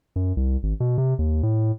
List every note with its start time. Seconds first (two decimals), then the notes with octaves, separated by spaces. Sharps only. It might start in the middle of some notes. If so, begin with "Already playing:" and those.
0.16 F#2
0.37 C2
0.63 G#1
0.80 B2
0.98 C3
1.19 D#2
1.43 A2